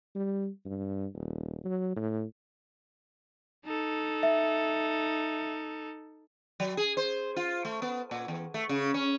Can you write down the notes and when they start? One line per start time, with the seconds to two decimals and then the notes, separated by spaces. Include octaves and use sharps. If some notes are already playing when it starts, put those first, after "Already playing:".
0.15 G3
0.66 G2
1.15 D#1
1.65 F#3
1.96 A2
3.65 D#4 A4
4.23 E5
6.60 F#3
6.77 G#4
6.97 C5
7.36 F4
7.65 A3
7.82 B3
8.11 A#2
8.28 E2
8.54 A3
8.69 C#3
8.94 C#4